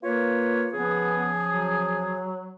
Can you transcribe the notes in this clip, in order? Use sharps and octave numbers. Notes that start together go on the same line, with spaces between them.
A#3 F4 B4 C#5
C#3 F3 B3 G#4
F#3